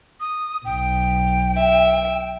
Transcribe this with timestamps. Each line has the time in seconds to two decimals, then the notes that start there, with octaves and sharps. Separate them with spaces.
0.20 D#6
0.65 B1 G5
1.58 E5